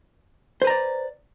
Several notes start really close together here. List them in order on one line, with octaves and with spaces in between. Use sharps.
C5 B4 A#5 D5